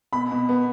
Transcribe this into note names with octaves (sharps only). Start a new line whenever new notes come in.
B2 B5
B2
B3